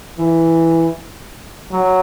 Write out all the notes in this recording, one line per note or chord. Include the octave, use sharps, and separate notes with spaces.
E3
F#3